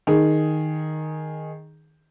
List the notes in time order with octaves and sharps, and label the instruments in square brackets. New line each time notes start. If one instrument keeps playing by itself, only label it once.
[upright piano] D#3 G#4